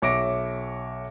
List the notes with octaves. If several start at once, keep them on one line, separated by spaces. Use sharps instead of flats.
B1 C#5 E5 D6 A#6 D7